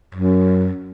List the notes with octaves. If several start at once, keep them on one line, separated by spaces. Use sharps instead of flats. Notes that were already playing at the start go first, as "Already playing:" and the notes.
F#2